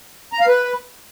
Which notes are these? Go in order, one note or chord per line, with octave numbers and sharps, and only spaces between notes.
A#5
F5
B4